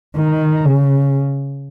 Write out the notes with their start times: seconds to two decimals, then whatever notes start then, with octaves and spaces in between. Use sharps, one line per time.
0.17 D#3
0.66 C#3